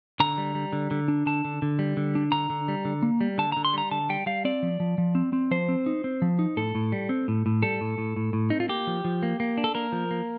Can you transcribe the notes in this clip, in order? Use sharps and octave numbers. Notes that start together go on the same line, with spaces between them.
D3 A#5
G3
G3
D3
D3
D4
D3 A5
D3
D3
G3
D3
D4
D3 A#5
D3
G3
D3
A#3
G3
D3 A5
D3 A#5
C6
G3 A#5
D3 A5
G3 G5
G3 F5
C4 D5
F3
F3
F3
C4
C4
F3 C5
C4
D#4
C4
F3
D#4
A2 A4
A2
G3
C4
A2
A2
G3 A4
A2
A2
A2
A2
C4 D#4
F4
A#3 G4
F3
F3
A#3
A#3
D4
A4
A#3 A#4
F3
A#3